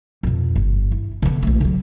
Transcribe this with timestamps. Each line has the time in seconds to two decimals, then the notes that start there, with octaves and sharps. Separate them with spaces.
0.23 F2 B2
0.56 G1
0.92 E4
1.22 D3 B3
1.43 A#1 A3
1.60 D3 F#3